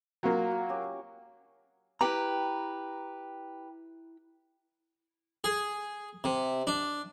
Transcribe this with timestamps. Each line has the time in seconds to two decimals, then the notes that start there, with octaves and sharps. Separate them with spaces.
0.23 F#3 A#3 F4
0.51 F#4
0.69 C#4 G4
2.01 E4 G4 B4 G5 A#5
5.44 G#4
6.24 C3
6.67 D4